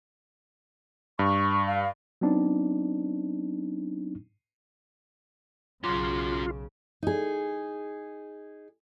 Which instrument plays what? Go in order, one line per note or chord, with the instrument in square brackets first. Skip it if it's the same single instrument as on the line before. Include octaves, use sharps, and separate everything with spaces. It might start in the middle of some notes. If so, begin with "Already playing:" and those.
[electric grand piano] G2 [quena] C#6
[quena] F5
[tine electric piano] F#3 B3 C4 D4 D#4
[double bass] B1 C#3 [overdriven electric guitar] F#3 C#4 [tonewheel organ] F4 [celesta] C6 D6 A#6
[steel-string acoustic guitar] D#4 G#4